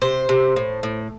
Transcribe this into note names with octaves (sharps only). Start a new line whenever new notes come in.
C3 C5
C3
A2
A2